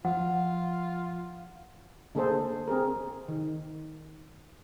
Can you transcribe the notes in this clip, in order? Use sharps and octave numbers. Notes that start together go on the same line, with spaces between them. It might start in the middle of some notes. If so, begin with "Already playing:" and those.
F3 F4 F#5
D3 A#3 G#4 A4 C5
C4 G#4 A#4
D#3